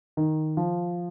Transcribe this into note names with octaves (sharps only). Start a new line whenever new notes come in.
D#3
F3